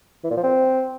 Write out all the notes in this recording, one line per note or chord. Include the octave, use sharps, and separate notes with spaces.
E3
A#2
F3
C4